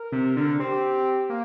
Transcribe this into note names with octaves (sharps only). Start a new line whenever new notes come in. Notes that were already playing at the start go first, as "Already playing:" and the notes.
Already playing: A#4
C3
D3
C4 G4
A#3